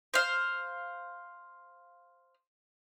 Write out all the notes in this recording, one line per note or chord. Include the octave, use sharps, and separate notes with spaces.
C5 F5